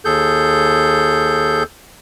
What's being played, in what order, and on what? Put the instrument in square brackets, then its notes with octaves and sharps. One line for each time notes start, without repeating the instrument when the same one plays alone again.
[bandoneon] D#2 G#4 A4 G6